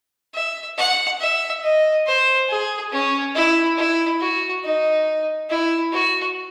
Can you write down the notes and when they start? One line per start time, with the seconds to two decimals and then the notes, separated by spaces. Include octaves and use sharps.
0.34 E5
0.78 F#5
1.20 E5
1.63 D#5
2.06 C5
2.49 G#4
2.92 C#4
3.35 E4
3.77 E4
4.21 F#4
4.64 D#4
5.50 E4
5.92 F#4